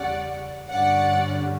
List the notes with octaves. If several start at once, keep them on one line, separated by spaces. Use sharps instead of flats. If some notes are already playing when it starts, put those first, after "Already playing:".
Already playing: E2 C#3 G3 C#4 D5 F#5
G2 D3 G3 C#4 D5 F#5